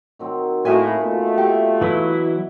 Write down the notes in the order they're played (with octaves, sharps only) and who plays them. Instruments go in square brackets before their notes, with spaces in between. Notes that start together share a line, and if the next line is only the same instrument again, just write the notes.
[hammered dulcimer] D#3 F#3 C4
[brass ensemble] A2 [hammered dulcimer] A#3 D#4 E4 [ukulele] F#4 E5 G#5
[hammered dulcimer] B2 F#5 [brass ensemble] A3 F4
[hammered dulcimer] F#4 D5 E5 [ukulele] G4
[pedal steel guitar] E3 F#3 E4 [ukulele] B4